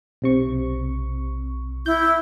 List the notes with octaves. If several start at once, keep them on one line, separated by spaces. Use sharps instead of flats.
B1 C3 C#6
E4 G6